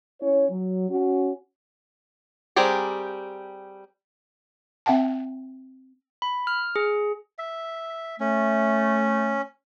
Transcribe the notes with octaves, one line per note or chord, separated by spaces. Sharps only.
C#4 E4 C#5
F#3
C#4 F#4
G3 C4 G4 G#4 A#4
C4 E5 F#5 G5 A5
B5
F6
G#4
E5
A3 C#4